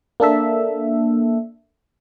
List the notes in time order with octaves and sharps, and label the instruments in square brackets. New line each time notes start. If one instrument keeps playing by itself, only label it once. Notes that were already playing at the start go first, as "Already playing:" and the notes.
[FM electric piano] A#3 D4 A4 E5